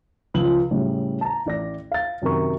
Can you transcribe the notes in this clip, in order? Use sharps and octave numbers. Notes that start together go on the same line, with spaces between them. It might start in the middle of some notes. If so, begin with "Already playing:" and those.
C#2 F3 F#7
A2 C#3 G3
A5 A#5
A1 D5 A#6
F5 A6
F#2 C3 D#3 A#4 C#6